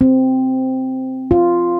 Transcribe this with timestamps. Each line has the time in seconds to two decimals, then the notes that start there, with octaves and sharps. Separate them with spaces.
0.01 C4
1.31 F4